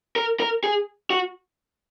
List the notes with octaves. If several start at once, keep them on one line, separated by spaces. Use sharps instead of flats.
A#4
A#4
G#4
F#4